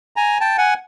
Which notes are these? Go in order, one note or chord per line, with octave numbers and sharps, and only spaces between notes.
G#5 A#5
G5 A5
F#5 G#5